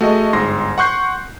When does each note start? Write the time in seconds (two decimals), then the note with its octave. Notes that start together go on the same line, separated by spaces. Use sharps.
0.01 A3 F#4 G#4 D#5
0.33 G1 G#2 C6 A#6
0.78 F#5 C6 C#6 F#6 G6 C7